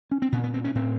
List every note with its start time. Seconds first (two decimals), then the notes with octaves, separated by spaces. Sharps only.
0.11 C#4
0.22 C4
0.32 A#2 B3
0.44 B3
0.54 C4
0.64 C#4
0.75 A2 C4